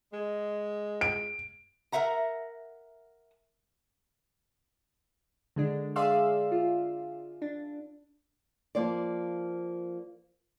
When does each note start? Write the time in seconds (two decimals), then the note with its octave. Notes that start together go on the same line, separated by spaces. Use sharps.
0.13 G#3
1.01 D7
1.92 A#4 B4 E5 F#5 A#5
5.56 D3 G#3 D4
5.96 G#4 D5 E5 F5 C6 E6
6.52 F4
7.42 D4
8.75 F3 A#3 C5 D5